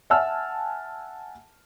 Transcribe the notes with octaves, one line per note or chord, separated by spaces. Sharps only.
E5 F#5 G#5 A5 E6 F6